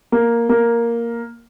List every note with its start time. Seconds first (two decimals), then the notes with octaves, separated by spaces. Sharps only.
0.12 A#3
0.49 A#3